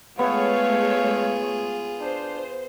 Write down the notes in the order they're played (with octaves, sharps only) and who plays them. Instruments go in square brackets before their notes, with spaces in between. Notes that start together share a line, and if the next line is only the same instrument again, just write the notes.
[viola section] G#3 A3 C#5 [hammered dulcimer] B3 [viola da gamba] F4 G#4 [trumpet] F5
[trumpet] D4 [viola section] C5